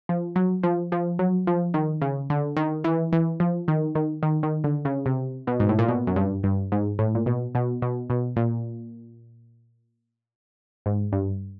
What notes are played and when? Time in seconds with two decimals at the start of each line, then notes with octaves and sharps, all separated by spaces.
0.09 F3
0.36 F#3
0.63 F3
0.92 F3
1.19 F#3
1.47 F3
1.74 D#3
2.01 C#3
2.30 D3
2.57 D#3
2.84 E3
3.13 E3
3.40 F3
3.68 D#3
3.95 D#3
4.23 D#3
4.43 D#3
4.64 D3
4.85 C#3
5.06 C3
5.47 B2
5.60 G#2
5.69 A2
5.79 A#2
5.88 B2
6.07 F#2
6.16 G2
6.44 G2
6.72 G#2
6.99 A2
7.15 A#2
7.26 B2
7.55 B2
7.82 B2
8.10 B2
8.36 A#2
10.86 G#2
11.13 G2